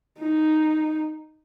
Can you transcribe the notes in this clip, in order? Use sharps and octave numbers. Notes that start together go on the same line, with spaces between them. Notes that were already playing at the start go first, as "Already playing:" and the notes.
D#4